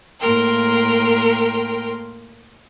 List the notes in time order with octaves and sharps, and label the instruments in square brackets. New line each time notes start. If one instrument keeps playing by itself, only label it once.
[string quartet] A2 A#3 A#4 G5 C6